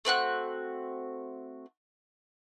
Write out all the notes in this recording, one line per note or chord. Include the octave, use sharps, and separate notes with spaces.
A3 C4 F#4 F#6